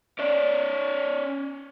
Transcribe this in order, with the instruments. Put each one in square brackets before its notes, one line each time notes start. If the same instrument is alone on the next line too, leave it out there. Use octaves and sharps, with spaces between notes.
[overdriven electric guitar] C#4 D5